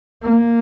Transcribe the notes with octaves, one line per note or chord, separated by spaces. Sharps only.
A#3